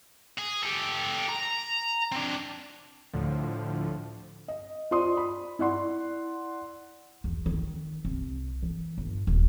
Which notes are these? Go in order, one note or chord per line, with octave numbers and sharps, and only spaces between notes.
G#4
G4 A4
A#5
C4 D4
D2 A2 D3 F3
D#5
F4 C5 D5 C6 D#6
B5
E4 D5 F#5 C6
E2
D#3
C2
E3
G1
D#1